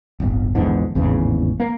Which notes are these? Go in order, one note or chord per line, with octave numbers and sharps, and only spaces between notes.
D1 G1
A#1 E2 G#2 D3
G#1 E2 A2 C#3
A#3